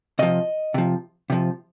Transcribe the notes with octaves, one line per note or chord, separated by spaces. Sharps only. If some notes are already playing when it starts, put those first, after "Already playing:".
C3 F3 D#5
C3 F3
C3 F3